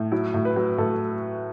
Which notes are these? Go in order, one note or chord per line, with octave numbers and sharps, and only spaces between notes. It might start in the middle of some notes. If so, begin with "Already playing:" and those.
Already playing: A2
F#3 E4
A2
B4
F#3
A2 A4